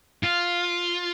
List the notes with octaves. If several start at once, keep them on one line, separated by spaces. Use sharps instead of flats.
F4